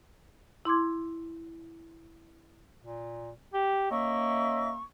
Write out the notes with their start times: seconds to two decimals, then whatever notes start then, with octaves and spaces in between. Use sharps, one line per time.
0.65 E4 C6 D6 G#6
2.83 A#2
3.53 G4
3.91 A#3 C#4 D#5 E5 C#6